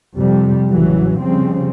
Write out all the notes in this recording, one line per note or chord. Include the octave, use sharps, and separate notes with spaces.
F2 C3 G3
A1 C#3 E3 F#3
C#3 F3 G3 C4